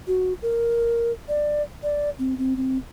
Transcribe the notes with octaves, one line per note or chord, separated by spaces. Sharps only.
F#4
A#4
D5
D5
C4
C4
C4